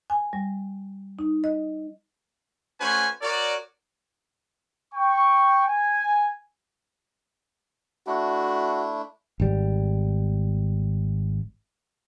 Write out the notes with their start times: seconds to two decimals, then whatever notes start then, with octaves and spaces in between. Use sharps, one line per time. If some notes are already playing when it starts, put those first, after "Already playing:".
0.10 G#5
0.33 G3
1.19 D#4
1.44 D#5
2.80 A3 C#4 F#4 B4 C5 G#5
3.22 F#4 A#4 C#5 D5
4.94 G5 C#6
5.67 G#5
8.07 A3 D4 E4 F#4
9.40 G#1 G3